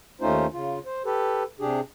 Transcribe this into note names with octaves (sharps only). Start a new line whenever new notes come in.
D#2 A3 C#4 D#4 F4 C5
C#3 F4
C5
G4 A4 B4
C3 D4 G4 G#4